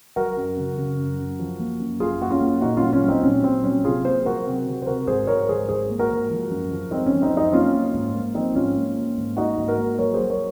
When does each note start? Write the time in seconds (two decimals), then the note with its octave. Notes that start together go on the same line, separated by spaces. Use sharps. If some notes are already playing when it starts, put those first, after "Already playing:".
0.16 F#3 F#4 A#4
0.37 F#2
0.57 C#3
0.77 C#3
0.99 F#2
1.19 F#2
1.39 F3
1.60 A#3
1.80 F#2
2.00 F#2 F4 G#4
2.21 A#3 F#4
2.31 C#4 F4
2.41 A#3
2.61 A#2 D#4 F#4
2.77 C#4 F4
2.82 F#3
2.93 C#4 F4
3.02 F#3
3.08 C4 D#4
3.23 A#2 C#4
3.43 A#2 C4
3.64 F#3 C#4
3.85 C3 F4 G#4
4.05 A#3 G#4 C5
4.25 F#3 F#4 A#4
4.46 C3 C4
4.67 C3
4.82 C5
4.86 C3 F#4 A#4
5.07 G#2 G#4 C5
5.27 G#2 A#4 C#5
5.48 G#2 G#4 C5
5.69 G#2 G#4 C5
5.90 A#3
5.99 F#4 A#4
6.10 G#2
6.30 F3
6.50 F#2
6.71 F3
6.91 G#3 C4 D#4
7.06 C#4
7.12 F3
7.22 C4 D#4
7.33 F#2 C4 D#4
7.52 A#3 C#4 F4
7.73 A#3
7.94 G#2
8.14 A#3
8.35 F3 C4 D#4
8.55 G#2 C#4 F4
8.76 A#3
8.96 A#3
9.17 G#2
9.37 A#3 D#4 F#4
9.57 G#2
9.68 F#4 A#4
9.78 A#3
9.98 F#3 A#4 C#5
10.14 F#3 G#4 C5
10.30 A#4 C#5